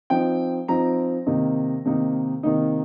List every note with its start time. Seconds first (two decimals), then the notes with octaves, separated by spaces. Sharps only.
0.10 F3 C4 D#4 G5
0.68 F3 C4 D#4 A#5
1.26 C3 D#3 A#3 D#4
1.85 C3 D#3 A#3 D#4
2.43 C3 D#3 A#3 D#4